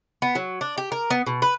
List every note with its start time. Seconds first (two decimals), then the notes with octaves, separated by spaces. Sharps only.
0.22 B3
0.35 F#3
0.61 D4
0.78 G4
0.92 A#4
1.10 B3
1.27 B2
1.42 B4